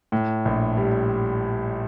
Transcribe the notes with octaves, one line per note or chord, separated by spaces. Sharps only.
A2
A#1
G3